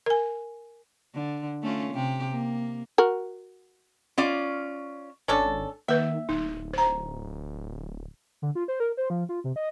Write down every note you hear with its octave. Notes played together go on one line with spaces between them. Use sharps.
A#4 G#5
D3
A3 C#4 F4
C3 G4
A#3
F#4 A#4
C#4 F4 D5
G#1 C#4 D4 A4
D#3 A#3 B4 E5
D1 D#4
C5 A#5
D3
F4
C5
A#4
C5
F3
F4
C3
D#5